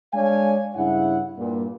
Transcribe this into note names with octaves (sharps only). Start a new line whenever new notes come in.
G#3 D4 C#5 F5 G#5
G2 C#3 E4 F#5
G2 A#2